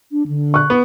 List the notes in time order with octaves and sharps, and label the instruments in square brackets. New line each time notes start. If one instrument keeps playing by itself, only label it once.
[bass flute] D4
D3
[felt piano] C#6 F#6
[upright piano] B3